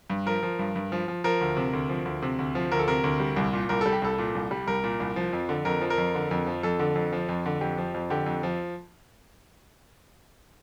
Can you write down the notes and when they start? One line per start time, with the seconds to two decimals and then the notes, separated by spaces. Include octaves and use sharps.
0.10 G2
0.26 F3 A#4
0.43 F3
0.59 G2
0.76 G2
0.92 F3
1.08 F3
1.24 F3 A#4
1.41 D2
1.57 C3
1.73 D2
1.89 F3
2.05 D2
2.22 C3
2.39 D2
2.55 F3
2.72 D2 A#4
2.79 A4
2.88 C3 A#4
3.04 D2
3.20 G3
3.36 C2
3.53 A#2
3.69 C2 A#4
3.81 G3 A4
3.93 G4
4.02 C2 A4
4.18 A#2
4.35 C2
4.51 G3
4.67 C2 A#4
4.84 A#2
5.00 C2
5.16 F3
5.33 F2
5.49 D3
5.65 F2 A#4
5.81 F3
5.90 A#4
5.98 F2
6.15 D3
6.31 F2
6.47 F3
6.63 F2 A4
6.79 D3
6.95 F2
7.13 F3
7.29 F2
7.46 D3
7.61 F2 G4
7.78 F3
7.94 F2
8.10 D3 G4
8.26 F2
8.43 F3